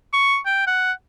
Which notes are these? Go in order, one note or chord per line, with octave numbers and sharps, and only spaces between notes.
C#6
G5
F#5